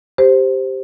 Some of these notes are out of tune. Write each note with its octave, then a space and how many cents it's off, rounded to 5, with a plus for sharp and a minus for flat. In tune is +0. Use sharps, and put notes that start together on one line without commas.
G4 +0 C5 +0